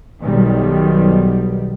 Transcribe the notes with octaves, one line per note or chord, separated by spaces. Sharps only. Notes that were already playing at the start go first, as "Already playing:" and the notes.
B1 B2 D#3 G3